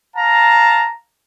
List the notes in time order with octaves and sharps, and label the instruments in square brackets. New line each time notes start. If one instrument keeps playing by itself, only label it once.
[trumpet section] F5 A5 A#5